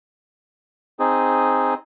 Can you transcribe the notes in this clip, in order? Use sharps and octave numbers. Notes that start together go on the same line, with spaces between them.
C4 D#4 G#4